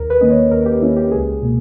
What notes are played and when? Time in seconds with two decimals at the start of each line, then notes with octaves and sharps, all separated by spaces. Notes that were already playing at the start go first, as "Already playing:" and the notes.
Already playing: D#2 A#4
0.10 B4
0.21 D#3 A#3 C#4 D#5
0.30 C#5
0.51 D#2 A#4
0.66 G4
0.82 D#3 A#3 C#4 E4
0.96 G4
1.11 C#2 G#4
1.42 B2 A#3